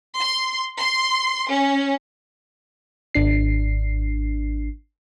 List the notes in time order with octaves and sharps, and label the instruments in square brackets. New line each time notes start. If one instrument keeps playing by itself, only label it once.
[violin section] C6
C6
C#4
[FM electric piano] G#1 D4 C7